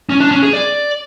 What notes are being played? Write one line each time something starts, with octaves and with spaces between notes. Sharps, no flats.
C#4
D4
C#4
G#4
D5